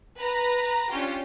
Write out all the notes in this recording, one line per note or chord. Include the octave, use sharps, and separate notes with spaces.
B4 A#5
C#4 D4 F4 G4